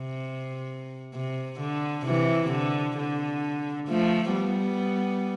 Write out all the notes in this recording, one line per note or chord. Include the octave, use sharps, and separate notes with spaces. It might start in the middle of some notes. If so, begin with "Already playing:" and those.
Already playing: C3
C3
D3
C3 E3
D3
D3
F3 A3
G3 B3